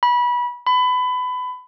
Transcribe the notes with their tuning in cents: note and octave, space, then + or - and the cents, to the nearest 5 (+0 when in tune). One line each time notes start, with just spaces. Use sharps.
B5 -25
B5 +25